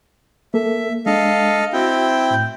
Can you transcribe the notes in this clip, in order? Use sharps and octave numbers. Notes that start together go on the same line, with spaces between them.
A#3 A4 E5
G#3 D4 A4 D#5 F5
C4 E4 F#4 G5
A2 G6